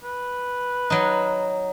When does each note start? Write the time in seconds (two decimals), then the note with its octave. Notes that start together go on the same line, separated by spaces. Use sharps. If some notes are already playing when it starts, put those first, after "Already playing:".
0.03 B4
0.90 F#3 D#4